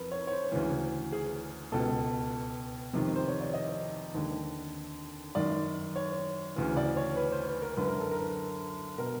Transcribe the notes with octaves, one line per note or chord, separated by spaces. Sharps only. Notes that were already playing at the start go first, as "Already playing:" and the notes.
Already playing: F2 A#4 B4
C#5
C#5
C5
D2 C#3 E3
G#4
C#2 B2 A4
F2 C3 D#3
C5
C#5
D5
D#5
D#2 D3
F#2 D#3 D5
C#5
D2 C#3 E3
D5
C#5
B4
C5
B4
A#4
F#2 D3 B4
A#4
A4
A#4
B2 A#4